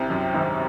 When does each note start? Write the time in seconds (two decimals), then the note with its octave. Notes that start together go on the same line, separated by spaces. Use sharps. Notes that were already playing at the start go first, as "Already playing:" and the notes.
Already playing: C2 C3
0.10 F#2
0.34 G#1 G#2